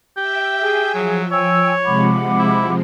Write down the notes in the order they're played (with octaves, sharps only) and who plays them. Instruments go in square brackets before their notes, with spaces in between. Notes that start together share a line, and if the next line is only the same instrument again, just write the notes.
[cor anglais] G4 [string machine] E5 G5
[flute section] G#4
[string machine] F3 [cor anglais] F#3
[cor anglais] C#5 [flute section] G5 G#5 E6
[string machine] C3 F3 G#3 [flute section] F#5 B5 D6
[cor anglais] E4